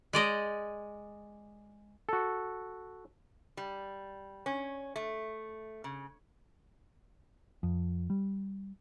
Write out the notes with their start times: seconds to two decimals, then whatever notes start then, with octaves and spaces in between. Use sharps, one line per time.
0.13 G#3 D5 D#5
2.09 F#4 A4
3.57 G3
4.46 C#4
4.96 A3
5.84 C#3
7.63 F2
8.10 G3